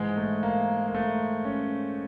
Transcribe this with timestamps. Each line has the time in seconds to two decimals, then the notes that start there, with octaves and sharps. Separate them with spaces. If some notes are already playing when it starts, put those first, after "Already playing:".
Already playing: G#2 E3 G#3
0.17 A3
0.43 A#3
0.88 A#3
0.94 A3
1.45 C#4